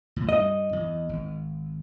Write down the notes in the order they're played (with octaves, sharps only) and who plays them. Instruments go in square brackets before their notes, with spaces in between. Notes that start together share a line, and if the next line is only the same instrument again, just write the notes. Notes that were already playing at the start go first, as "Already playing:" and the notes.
[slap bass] E2 A2
[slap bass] G2 G3 [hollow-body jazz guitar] D#5
[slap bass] E2
G#1